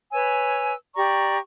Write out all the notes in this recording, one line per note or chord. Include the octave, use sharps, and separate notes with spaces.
B4 C#5 G#5 E6
G4 D5 A#5 C#6